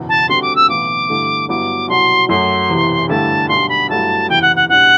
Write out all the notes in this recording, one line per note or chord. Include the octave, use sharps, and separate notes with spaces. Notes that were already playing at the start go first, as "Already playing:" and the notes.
Already playing: F#1 E2 B2 F#3
A5
D2 D3 G3 C4 F#4 C6
D6
E6
B1 A2 E3 B3 D6
G2 D3 A3 E4
G2 F#3 B3 E4 D6
C2 B2 F#3 C6
F#2 F#3 A3 C6
E1 E2 C3 E3
G2 D3 A3 E4 G4 A5
B1 B2 G3 D4 C6
B5
G2 F#3 A3 E4 A5
F#1 E2 C3 E3 G5
F#5
F#5
E2 B2 G3 D4 F#5